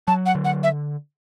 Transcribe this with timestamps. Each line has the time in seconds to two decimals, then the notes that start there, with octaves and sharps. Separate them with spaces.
0.08 F#3 A5
0.26 F#5
0.35 D3
0.45 F#5
0.63 E5